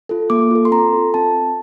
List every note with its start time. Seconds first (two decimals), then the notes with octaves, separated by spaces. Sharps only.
0.09 F4 A4
0.30 A#3 D6
0.51 F4 A4
0.65 C6
0.71 C4 A#5
0.93 F4 A4
1.14 C4 A5